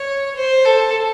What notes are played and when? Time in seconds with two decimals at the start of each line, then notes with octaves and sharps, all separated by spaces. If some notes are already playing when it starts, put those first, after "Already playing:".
Already playing: C#5
0.36 C5
0.65 A4